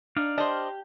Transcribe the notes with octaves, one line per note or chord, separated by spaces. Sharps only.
D4 D#4 D5 F5
D4 G4 C5 D#5 G5 F6